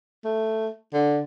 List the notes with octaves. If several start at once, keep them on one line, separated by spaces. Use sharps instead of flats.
A3
D3